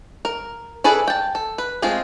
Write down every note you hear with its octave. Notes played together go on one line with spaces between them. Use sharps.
A#4
E4 G#4 A4 B4 D5
G5 A5
A4
B4
G#3 A3 C4 F4 G#4